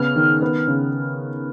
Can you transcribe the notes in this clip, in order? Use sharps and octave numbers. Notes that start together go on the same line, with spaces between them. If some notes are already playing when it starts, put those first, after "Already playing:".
Already playing: C#3 B3 F6
D#3
B3
C#3